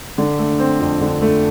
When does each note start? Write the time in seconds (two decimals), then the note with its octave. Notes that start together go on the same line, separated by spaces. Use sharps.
0.18 D3
0.39 A3
0.59 C4
0.80 F2
1.01 D3
1.21 A3